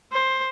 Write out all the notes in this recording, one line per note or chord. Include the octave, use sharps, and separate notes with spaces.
C5